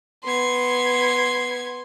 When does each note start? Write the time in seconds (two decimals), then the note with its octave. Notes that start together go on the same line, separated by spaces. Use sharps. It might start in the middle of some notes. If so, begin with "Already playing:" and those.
0.24 B3 C6 G#6